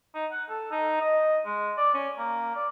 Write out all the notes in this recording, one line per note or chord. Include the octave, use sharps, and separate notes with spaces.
D#4
F#5
A4
D#4
D#5
G#3
D5
C#4
A#3
D5